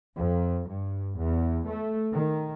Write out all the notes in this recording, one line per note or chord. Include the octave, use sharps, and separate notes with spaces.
F2
G2
E2
A3
D#3